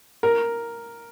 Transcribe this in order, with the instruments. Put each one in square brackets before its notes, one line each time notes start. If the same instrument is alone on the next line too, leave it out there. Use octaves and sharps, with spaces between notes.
[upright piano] A#4